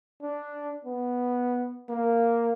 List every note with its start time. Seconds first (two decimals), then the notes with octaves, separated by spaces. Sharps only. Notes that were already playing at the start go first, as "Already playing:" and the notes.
0.22 D4
0.85 B3
1.89 A#3